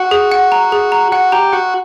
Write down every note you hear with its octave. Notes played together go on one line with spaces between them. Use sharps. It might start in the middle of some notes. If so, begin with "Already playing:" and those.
Already playing: F#4 F#5
G#4
F#5
A#5
G#4
A#5
F#4 F#5
G4 A#5
F#4 F#5